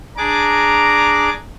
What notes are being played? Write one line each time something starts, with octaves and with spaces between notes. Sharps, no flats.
D4 G#4 A#5 D6